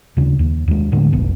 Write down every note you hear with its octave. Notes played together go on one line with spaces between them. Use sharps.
D#2 C#3
D#2
D#2 G#3
A2 D3 G#3
F1 B1 B2